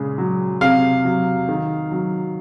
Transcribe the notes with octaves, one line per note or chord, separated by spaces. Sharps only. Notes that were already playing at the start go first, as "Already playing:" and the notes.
Already playing: A#2 C#3 G#3
F#3
C3 F5
F#3
D#3
F#3